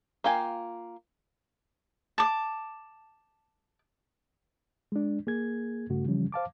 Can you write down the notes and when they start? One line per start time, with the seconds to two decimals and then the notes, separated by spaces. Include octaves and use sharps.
0.24 A#3 F4 G5 G#5
2.18 A5 D6
4.92 G#3 D4
5.27 A#3 G#4 G#6
5.90 G2 C#3 A3 F#4
6.05 C#3 E3 F3 G3 C#4
6.32 C5 F5 A5 D6